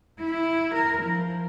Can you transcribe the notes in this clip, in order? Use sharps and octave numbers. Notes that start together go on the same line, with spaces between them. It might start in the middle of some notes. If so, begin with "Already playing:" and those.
E4
A#4
F3